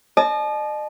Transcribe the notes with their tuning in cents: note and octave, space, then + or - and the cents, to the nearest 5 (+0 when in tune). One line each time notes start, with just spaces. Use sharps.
D#5 -40 A5 -35